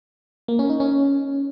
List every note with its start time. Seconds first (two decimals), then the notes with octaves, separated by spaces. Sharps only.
0.48 A#3
0.59 C#4
0.70 D#4
0.80 C#4